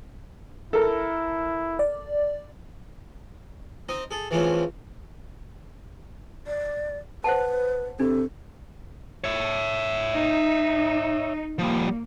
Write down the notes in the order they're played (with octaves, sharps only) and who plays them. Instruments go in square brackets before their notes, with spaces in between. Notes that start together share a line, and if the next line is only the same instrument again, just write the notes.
[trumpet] E4 [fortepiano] A4 A#4
[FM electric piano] D5
[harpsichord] C4 D#4 D#5
G#4 A4
E3 F3 G#3 A3 C4 C#4
[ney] D5
[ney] B4 [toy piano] C5 F#5 A5
[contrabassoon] C3 [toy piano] D4 [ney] A4
[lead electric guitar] C#5 E5
[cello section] D#4
[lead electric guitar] F3 G3 [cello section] A#3